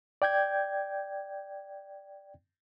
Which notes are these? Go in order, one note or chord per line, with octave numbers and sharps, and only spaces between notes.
D5 G5 G6 G#6